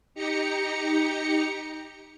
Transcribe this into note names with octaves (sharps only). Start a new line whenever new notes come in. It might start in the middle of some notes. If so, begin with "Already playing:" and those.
D#4 G4 A#5 C#7